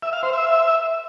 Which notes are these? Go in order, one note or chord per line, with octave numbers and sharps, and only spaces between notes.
E5
F5
C5
E5